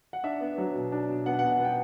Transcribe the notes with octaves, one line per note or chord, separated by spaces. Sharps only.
F#5
D4 E5
B3
F#3
B2
D4
B2
B3 F#5
F#5
B2
F#5
B3 G5